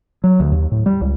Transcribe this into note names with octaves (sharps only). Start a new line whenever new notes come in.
F#3
D2
D#2
A2
G3
C#2